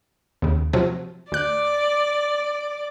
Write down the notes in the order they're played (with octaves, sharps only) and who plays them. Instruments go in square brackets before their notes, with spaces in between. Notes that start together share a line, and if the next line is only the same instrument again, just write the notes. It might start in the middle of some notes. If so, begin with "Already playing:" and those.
[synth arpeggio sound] D#2 C#3
C3 F3 F#3
[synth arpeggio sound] D2 F#6 [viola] D5